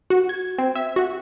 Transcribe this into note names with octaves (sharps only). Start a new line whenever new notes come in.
F#4
G#6
C4
E5
F#4